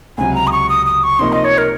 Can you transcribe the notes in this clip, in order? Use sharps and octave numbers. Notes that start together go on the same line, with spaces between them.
C#2 C3 F#3 G#5
A#5
D#6
C#6
D#6
D#6
C#6
C3 F3 A#3 D#4 C6
D#5
C#5
A#4